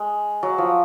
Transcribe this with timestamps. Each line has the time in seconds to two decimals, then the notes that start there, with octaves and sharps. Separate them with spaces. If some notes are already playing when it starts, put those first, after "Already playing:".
Already playing: G#3
0.43 F#3
0.58 F3